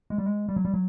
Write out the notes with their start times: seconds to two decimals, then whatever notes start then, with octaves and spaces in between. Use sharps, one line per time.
0.10 G#3
0.18 G3
0.26 G#3
0.49 G3
0.56 F#3
0.65 G3
0.74 F#3